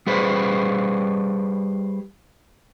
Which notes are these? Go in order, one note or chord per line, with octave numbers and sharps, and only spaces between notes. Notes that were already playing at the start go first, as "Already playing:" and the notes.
G3 G#4 B4 C5